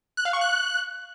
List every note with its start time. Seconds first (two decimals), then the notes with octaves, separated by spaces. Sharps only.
0.17 F#6
0.25 F5
0.33 C#6
0.41 F#6